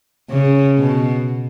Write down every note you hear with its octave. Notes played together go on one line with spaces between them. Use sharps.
C#3
B2